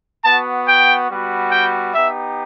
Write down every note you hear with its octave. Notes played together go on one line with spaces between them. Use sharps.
B3 F#4 A5
G5
G3 B3 F#4
G5
B3 D#4 G4 E5